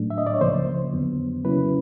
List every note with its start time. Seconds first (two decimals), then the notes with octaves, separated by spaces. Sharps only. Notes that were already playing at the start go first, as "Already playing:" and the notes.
Already playing: A2 F#3 A3 D4
0.10 E5
0.18 D#5
0.27 D5
0.34 C#5
0.41 C#2 C#3 F3 A#3 C5
0.93 F2 D3 F#3 B3
1.45 C#3 F#3 A#3 C#4 E4 B4